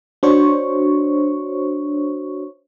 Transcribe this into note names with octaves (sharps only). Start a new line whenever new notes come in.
D4 F#4 C5 C#5 C#6